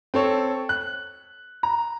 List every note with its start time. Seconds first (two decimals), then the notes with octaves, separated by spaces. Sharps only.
0.14 C4 A4 C#5
0.69 F#6
1.63 A#5